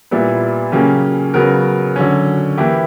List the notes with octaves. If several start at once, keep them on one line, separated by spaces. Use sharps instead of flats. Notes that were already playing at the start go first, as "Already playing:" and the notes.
A#2 G3 B3 E4
C#3 F#3 A#3 C#4 G4
C#3 F#3 B3 F#4 A#4
D3 F#3 C#4
E3 A#3 E4 G4